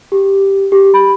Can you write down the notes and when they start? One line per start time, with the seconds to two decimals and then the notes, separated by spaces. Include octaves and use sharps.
0.12 G4
0.72 G4
0.94 B5